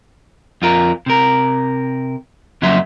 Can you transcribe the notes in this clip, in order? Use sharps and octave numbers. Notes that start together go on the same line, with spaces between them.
F2 F4 A#4
C3 A#4
F2 C#3 F#3 A#3 E5 C6